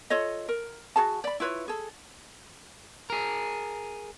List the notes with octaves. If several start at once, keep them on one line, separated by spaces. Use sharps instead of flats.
F4 A4 C#5 D#5
A#4
F#4 G#4 A5
D5 B5
E4 F4 B4 C#5
G#4 A4
G#4 A#4